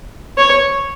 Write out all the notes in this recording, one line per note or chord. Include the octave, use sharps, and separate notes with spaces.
C#5